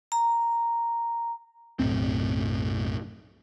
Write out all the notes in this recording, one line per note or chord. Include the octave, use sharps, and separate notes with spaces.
A#5
B1 F#2 A2 C4